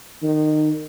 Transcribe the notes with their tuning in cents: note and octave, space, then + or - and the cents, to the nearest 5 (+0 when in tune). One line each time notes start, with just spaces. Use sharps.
D#3 -25